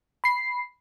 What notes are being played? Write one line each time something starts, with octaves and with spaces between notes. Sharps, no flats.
B5 C7